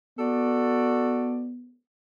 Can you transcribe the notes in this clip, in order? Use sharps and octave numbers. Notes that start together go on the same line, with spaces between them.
B3 F#4 A4 D5